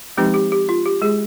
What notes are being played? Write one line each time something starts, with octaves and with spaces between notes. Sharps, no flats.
F3 G#3 C4 D#4 G4
G4
G4
F4
G4
G#3 G#4